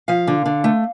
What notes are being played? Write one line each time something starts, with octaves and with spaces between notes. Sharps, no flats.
F3 F5
D3
D3
A3